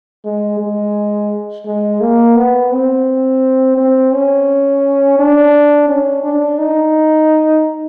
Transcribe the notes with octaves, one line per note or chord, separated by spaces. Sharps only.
G#3
G#3
G#3
A#3
B3
C4
C4
C#4
D4
C#4
D4
D#4